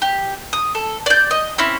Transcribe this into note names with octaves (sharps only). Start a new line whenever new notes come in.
G4
D#6
A4
D5 G6
D#5
C4 C#4 E4